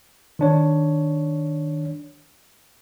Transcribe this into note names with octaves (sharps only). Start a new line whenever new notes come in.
D#3 D4 C#5